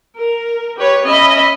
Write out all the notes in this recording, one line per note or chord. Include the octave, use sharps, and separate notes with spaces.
A#4
G4 B4 C#5
C#4 D#5 E5 B5